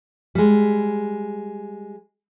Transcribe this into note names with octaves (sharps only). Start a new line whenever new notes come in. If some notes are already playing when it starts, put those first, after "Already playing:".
G3 G#3